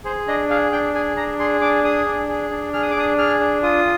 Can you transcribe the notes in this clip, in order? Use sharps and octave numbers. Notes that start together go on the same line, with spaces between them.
G#4 C5
D4 D#5
G#4 F5
D4 G5
G#4 G#5
D4 A#5
G#4 C6
D4 D6
G#4 D#6
D4
G#4
D4
G#4 F6
D#6
D6
D4 D#6
G#4 F6
D4
F4 D#6